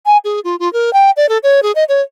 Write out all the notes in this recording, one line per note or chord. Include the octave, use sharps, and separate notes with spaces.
G#5
G#4
F4
F4
A#4
G5
D5
A4
C#5
G#4
D#5
C#5